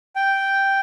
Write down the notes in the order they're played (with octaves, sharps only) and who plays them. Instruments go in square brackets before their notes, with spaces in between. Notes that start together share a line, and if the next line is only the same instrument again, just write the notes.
[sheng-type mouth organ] G5